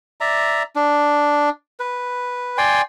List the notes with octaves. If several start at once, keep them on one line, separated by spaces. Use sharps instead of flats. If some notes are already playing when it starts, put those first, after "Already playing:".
D5 E5 A#5
D4
B4
D5 G5 G#5 C6